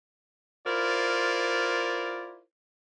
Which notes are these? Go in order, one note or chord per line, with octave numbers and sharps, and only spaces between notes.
E4 F4 A#4 C5 D5